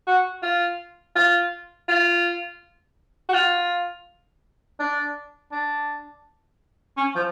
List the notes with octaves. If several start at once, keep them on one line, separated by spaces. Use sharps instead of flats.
F#4
F4
F4
F4
F#4
F4
D4
D4
C#4
F3